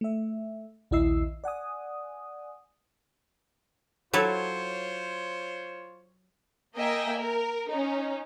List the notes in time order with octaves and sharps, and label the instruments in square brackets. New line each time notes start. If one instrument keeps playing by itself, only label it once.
[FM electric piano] A3 E5
A#1 D#2 E4 D#5 E6 C7
D5 F#5 G#5 D#6
[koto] F#3 E4 A4 [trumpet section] F4 C5 C#5
[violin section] A#3 D#5 E5 G5 G#5
A#4
C#4 D#4